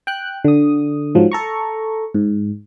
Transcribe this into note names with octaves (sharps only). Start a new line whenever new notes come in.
G5 F#6
D3 D#6
G#2 F3 F#3
A4 A#5 C#6
G#2